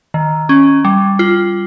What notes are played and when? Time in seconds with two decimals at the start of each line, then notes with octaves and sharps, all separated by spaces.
0.14 D#3
0.49 C#4
0.85 G3
1.19 F4